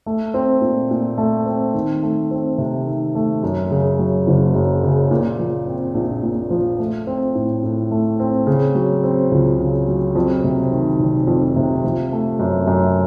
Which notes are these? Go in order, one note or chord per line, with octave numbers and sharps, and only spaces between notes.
A3
C4
A#2
A#2
A3
C4
D#3
A3
C4
C3
D#3
A3
F#2
C#3
F#3
F#1
F#2
C#3
A#2
F3
C4
A#1
A#2
F3
A3
C4
A2
A2
A3
C4
C#3
F#3
C4
C#2
C#3
F#3
F2
C3
D#3
F1
F2
C3
F3
A3
F#2
F#2